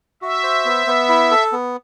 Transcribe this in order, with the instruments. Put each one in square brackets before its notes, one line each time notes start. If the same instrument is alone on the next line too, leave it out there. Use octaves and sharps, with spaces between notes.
[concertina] F#4 [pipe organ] E5
[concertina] C5
B3
B3
E4
A4
B3